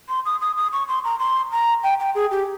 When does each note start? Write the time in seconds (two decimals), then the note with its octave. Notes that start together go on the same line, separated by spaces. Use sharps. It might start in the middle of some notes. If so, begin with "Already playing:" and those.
0.09 C6
0.26 D#6
0.41 D#6
0.57 D#6
0.73 C#6
0.88 C6
1.05 A#5
1.20 C6
1.52 A#5
1.83 G5
2.00 G5
2.15 G#4
2.31 G4